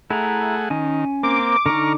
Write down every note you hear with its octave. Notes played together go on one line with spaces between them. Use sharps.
A3 E4 G#4 F#5 A#5
D#3 C#4 G#5
A#3 C4 D6
D3 D#4 A#5 C#6 F6